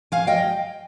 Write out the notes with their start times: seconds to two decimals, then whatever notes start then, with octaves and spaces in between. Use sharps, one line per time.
0.12 F5 G#5
0.27 D#5 G5